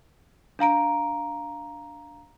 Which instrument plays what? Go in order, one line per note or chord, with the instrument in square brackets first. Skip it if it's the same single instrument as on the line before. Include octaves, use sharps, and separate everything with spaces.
[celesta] D4 F5 A#5 D7